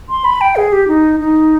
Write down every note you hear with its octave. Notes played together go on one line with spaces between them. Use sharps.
C6
B5
G5
G#4
G4
D#4
D#4